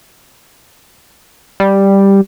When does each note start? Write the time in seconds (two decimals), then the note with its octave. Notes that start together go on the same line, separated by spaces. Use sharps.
1.60 G3